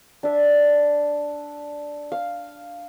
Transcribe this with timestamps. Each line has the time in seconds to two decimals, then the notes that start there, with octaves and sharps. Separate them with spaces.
0.23 D4 E5
2.12 F5